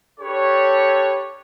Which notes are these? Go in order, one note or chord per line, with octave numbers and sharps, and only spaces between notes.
D4 G4 A4 B4 C#5